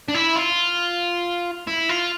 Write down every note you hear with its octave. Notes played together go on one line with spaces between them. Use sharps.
D4
E4
F4
E4
F4